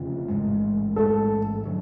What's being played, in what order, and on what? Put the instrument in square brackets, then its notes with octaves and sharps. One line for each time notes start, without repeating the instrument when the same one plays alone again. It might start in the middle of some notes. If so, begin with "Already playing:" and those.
Already playing: [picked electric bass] F1 F2 C#3 F3
A1 G#2 G#3
[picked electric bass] A1 G#2 G#3 [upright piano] A4
[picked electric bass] D3 F#3